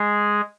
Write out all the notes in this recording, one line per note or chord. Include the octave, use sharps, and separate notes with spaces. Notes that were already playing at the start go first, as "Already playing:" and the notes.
Already playing: G#3 G#4